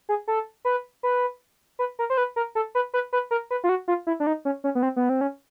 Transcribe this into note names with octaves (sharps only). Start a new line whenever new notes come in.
G#4
A4
B4
B4
B4
A#4
C5
B4
A#4
A4
B4
B4
B4
A#4
B4
F4
F#4
F4
E4
D4
D#4
C#4
C#4
B3
C4
B3
C4
C#4